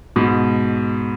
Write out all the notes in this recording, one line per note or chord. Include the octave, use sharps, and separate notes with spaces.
G#2 B2